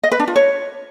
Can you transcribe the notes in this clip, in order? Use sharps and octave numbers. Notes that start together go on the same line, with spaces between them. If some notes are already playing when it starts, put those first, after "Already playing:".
D#5
B4
D4
F4
C#5